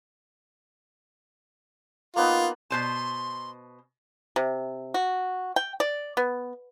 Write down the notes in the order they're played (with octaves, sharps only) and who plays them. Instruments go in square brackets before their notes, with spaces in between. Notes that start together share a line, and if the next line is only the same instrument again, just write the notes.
[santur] A#3 B3 D#4 [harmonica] F4
[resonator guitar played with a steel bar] B2 C5 A5 [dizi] C6
[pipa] C3
F#4
G5
D5
B3